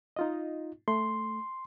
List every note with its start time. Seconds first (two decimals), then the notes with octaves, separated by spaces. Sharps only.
0.16 D#4 F4 D#5
0.88 A3 C6